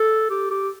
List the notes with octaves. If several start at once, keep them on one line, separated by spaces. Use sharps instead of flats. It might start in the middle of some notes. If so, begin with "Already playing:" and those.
Already playing: A4
G4
G4